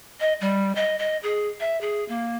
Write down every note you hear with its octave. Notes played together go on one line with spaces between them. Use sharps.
D#5
G3
D#5
D#5
G#4
E5
G#4
A#3